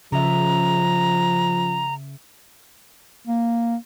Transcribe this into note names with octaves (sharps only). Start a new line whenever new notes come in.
C#3 F3 E5 A#5
A#3